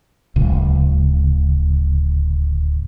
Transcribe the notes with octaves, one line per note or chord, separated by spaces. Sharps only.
D1 C#2